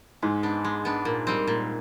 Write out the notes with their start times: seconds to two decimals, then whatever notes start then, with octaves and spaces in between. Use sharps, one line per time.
0.22 G#2 G#3
0.43 B3 D4
0.65 G#3
0.85 B3 D4
1.05 A#2
1.27 G3 C4
1.47 A#2